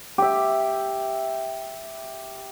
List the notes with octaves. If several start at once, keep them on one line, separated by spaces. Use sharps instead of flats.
G4 E5